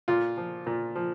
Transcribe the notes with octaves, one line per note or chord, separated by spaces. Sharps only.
A#2 F4
F3
A#2
F3